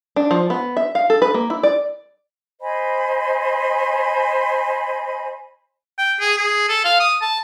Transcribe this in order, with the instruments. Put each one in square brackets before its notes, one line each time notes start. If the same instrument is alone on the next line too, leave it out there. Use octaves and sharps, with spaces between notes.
[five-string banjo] D4
F3
B3
E5
F5
A4
B4
A#3
E4
D5
[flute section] C5 D#5 G#5 B5
[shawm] G5
G#4
G#4
A4
F5
D#6
A5